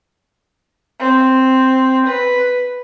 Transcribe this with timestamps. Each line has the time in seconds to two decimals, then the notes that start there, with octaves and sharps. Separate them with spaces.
0.98 C4
2.06 B4